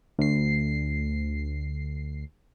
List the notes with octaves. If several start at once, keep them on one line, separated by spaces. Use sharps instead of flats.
D2 C7